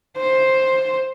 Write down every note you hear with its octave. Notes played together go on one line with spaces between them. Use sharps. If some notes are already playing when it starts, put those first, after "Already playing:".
C5